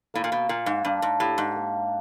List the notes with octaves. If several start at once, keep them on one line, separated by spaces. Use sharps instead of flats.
A2 A#3
A#2
B2
A#2 A#3
G#2
G2 D4
G#2
A2 G4
G#2
A#3